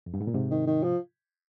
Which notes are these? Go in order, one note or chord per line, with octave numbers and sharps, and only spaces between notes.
F2
G2
G#2
A#2
G#2 C3
D#3
D#3
F3